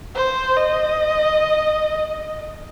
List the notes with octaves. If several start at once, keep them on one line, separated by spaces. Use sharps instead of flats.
C5
D#5